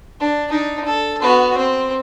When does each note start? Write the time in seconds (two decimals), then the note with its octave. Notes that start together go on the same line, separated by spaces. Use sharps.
0.20 D4
0.50 D4 D#4
0.85 A4
1.21 B3 F#4
1.57 C4